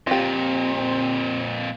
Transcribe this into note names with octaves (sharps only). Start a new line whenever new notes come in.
F2 A#2 C4 F4 G4